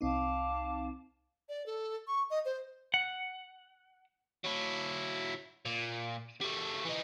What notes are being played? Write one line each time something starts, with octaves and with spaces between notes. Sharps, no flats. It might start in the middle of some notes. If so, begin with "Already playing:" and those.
C2 C4 D#4 F5 A5 D6
D5
A4
C#6
D#5
C5
F#5
F#3 E4
A#2
G3 A3
E3 D#4